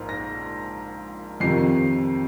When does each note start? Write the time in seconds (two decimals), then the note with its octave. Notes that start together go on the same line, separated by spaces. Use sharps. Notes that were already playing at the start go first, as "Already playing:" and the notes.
Already playing: A#1 G#2 A#3
0.09 A#6
1.40 F2 C3 D#3 C7